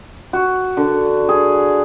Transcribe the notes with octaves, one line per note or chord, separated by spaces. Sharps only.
F#4
D3
G#4